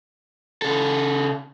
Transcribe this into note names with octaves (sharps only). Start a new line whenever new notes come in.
C#3 A4